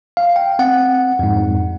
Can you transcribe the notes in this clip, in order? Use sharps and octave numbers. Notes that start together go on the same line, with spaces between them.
F5
G5
C4 F#5
F2 G#2